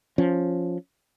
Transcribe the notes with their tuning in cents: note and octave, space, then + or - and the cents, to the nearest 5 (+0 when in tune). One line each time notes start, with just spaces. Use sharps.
F3 +5 C#4 +0